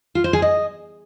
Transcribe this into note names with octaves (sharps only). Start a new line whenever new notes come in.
F4
C5
G#4
D#5